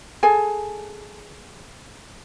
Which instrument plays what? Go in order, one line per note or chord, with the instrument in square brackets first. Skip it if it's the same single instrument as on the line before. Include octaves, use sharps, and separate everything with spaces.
[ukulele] G#4 A4 G#5